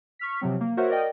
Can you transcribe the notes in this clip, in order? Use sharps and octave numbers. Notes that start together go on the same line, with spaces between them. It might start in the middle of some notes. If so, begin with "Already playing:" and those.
C#6 F6 B6
C3 F3 F#3 C4
A#3
F#4 A#4 C5 C#5 E5 F#5
A#4 D5 D#5 G5